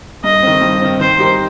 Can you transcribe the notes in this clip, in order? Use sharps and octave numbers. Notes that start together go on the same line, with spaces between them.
G2 D#5
D#3 C4
G2
D#3 C4
D#3 C5
G3 D#4 G4 A#4